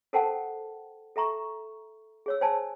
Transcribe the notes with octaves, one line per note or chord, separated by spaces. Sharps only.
A4 A#4 C5 F#5 G5 A5
A4 E5 A#5 C#6
G#4 C#5 E6
C5 D5 G#5 A5